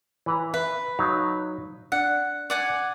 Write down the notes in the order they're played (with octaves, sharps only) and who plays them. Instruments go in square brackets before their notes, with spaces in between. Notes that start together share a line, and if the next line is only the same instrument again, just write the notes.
[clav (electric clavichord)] E3 B4 A#5
[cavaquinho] B4 [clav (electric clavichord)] E5
[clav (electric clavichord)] F#3 D#4 F5
[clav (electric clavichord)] D4 [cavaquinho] F#5
[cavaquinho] D5 F#5 G#5